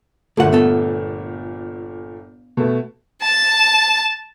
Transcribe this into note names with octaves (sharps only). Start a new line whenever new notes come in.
G1 D2 A#2 A3 F#5
B3 A4
B2 A3
A5